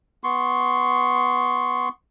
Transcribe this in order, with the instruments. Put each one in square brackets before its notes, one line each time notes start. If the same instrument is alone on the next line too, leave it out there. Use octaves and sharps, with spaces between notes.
[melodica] B3 C6 C#6